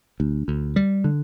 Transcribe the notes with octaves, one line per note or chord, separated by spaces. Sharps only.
D2
D2
G3
D3